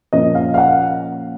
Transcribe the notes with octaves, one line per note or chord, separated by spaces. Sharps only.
A#2 F3 A#3 C#4 D#5
F5
F5
F#5